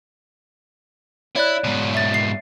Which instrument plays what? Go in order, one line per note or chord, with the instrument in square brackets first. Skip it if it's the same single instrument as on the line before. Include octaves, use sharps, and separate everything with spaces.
[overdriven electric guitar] E4 [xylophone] C#5 D5 F#6
[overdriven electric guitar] G#2 B2
[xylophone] E5 A6
C7